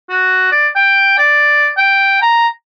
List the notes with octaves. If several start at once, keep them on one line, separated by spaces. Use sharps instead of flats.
F#4
D5
G5
D5
G5
A#5